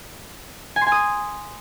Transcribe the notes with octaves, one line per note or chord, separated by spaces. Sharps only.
G#5
C6
G#5
D#6